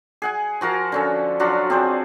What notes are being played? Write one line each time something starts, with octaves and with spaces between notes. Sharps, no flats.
G#4 F#5 G#5
F3 F#4 A#4 A5
D3 C#4 A4
F#3 D4 F4 F#4
C4 D4 G#4 C5